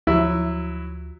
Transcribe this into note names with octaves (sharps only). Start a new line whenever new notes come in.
D2 F3 F#3 E4